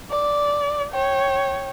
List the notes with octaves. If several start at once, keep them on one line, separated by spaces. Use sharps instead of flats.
D5
C#5 G5